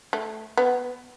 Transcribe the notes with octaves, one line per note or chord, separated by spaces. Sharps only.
A3
B3